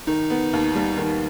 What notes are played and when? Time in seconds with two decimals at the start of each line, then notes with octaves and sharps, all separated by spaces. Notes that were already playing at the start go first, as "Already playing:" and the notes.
0.07 D#3 D#4
0.30 B3
0.53 D#2
0.75 G3
0.97 D#3